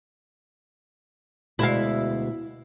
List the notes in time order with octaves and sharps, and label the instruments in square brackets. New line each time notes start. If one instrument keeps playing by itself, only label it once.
[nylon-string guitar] D2 B2 G#3 [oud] E4 F5